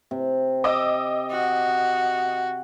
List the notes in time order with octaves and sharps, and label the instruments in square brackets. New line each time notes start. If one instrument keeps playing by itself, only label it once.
[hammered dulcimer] C3
[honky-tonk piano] D#5 D6 E6
[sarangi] F#4